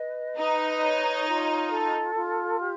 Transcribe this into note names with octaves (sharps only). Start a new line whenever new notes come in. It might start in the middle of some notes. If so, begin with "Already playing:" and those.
Already playing: B4 D#5
D#4 B4
C#5
F4
A4
F4
G4